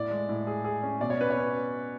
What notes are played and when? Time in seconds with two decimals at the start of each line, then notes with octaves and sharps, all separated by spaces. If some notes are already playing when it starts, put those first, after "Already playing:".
Already playing: A2 D5
0.11 G#3
0.29 A2
0.47 G#4
0.64 G#4
0.83 C#4
1.00 B2 D5
1.10 C#5
1.18 C#4 B4
1.30 C#5
1.36 C#4